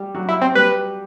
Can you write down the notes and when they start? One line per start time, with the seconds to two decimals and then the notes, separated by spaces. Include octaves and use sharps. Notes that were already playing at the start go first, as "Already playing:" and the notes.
Already playing: G3 G4
0.15 F#3 F#4
0.28 E4
0.41 C4
0.55 G3 G4 B4